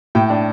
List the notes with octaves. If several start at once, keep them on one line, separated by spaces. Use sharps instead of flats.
A2 G5
D4